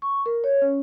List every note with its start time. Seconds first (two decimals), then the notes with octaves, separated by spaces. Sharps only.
0.02 C#6
0.26 A#4
0.44 C#5
0.62 C#4